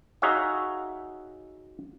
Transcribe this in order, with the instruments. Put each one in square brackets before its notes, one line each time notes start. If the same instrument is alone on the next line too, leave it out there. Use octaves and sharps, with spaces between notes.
[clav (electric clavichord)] D#4 F#4 G#4 C#5 E5 F5